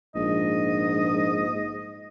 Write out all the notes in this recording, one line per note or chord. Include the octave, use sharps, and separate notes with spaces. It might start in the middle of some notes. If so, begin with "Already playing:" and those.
A#1 G#2 D#5